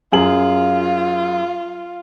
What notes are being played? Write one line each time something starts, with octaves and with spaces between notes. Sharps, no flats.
F#2 F4 G#4 F#7